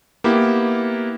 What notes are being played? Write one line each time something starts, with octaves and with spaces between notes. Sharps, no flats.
A#3 B3 E4 G4